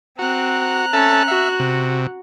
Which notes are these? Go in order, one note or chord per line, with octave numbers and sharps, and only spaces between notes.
C4 F#4 A#5 F#6
C#4 A4 E5 A5
F#4 E5
C3